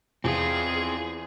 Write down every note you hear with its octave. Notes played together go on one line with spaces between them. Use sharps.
E2 C4 F4 G#4